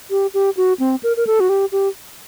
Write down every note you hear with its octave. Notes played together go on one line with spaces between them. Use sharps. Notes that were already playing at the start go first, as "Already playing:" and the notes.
G4
G4
F#4
C4
A#4
A#4
A4
F#4
G4
G4